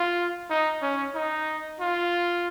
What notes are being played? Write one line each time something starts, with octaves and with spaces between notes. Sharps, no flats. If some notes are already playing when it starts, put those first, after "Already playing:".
Already playing: F4
D#4
C#4
D#4
F4